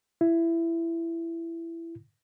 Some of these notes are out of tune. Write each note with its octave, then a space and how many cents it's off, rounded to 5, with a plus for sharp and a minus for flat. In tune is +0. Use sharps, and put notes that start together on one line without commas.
E4 +15